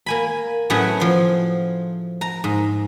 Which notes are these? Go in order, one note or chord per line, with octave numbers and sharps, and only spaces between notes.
A#3 G#5 B5
A2 F#3 A3 B3 C#4 G#4
F3 C6
A#5
G#2